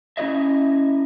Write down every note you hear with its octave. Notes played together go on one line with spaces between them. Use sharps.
C#4 E4 F4 B4 D#5 E5